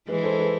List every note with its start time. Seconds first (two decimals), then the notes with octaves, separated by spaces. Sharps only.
0.08 E3 G#3 G#4 B4
0.23 A4 C5
0.39 G#4 B4